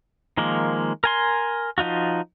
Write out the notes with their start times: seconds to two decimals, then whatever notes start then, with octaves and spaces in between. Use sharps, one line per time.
0.37 D#3 F3 G#3 A#3
1.04 A#4 G#5 C6
1.78 F3 D#4 F4 F#4